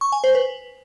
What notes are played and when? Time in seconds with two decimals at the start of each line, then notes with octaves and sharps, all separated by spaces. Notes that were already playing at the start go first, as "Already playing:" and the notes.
0.01 C#6
0.12 G#5
0.24 C5
0.35 B4